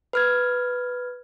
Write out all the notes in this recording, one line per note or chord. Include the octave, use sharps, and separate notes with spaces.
B4 F6 G#6